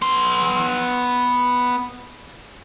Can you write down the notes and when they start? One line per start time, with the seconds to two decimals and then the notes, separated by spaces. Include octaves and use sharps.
0.02 B3 C6